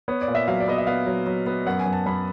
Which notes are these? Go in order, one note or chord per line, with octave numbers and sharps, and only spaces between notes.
B3 C#5
D5
A#2
E5
F#3 F5
D5
B3 D#5
E5
B3 F5
F#3
F#3
B3
F#2 F#5
G#5
F#2
A5
F#2 B5